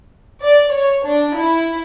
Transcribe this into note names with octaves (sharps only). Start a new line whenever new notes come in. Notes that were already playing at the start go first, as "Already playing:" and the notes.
D5
C#5
D4
E4